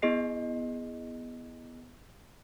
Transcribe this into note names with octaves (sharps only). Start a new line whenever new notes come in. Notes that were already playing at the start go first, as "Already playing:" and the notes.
B3 E4 G#4 D#5 C7